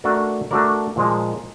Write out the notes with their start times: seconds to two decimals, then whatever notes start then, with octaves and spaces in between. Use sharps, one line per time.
0.04 A3 D4 F#4 A#4 D5
0.51 A3 D4 F#4 A#4 D5
0.96 A#2 F3 G#3